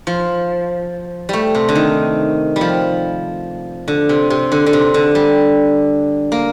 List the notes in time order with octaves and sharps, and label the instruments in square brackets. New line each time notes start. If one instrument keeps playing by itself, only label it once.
[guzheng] F3
G3 A3
C3
D3
D#3
G3
F3
D3
C3
C3
D3
D3
C3
D3
G3
A#3